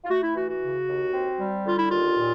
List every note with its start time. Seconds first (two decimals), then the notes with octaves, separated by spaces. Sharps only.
0.05 F4
0.09 A3 F#4
0.22 E4
0.35 E3 F#4
0.49 F#4
0.62 C#3
0.87 D#2
1.13 C4
1.39 G3
1.65 D3 F4
1.78 E4
1.90 D#2 F4
2.17 A#2